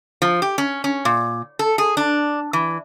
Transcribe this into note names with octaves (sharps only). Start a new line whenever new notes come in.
F3
G4
C#4
C#4
A#2
A4
G#4
D4
E3